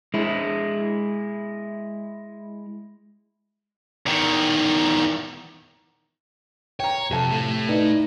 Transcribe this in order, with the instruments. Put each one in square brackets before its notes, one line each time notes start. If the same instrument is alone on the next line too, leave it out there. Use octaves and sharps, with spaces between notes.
[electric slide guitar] G#3 E4
[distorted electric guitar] E2 D#3
[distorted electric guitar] C#5 [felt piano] G5 A#5
[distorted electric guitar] F2 [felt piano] C3 A4 A5
[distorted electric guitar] A2 A3
[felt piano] D#4 B4 D5